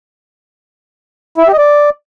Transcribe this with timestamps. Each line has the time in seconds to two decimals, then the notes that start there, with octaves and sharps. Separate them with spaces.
1.38 E4
1.43 E5
1.48 G4
1.53 D#5
1.58 D5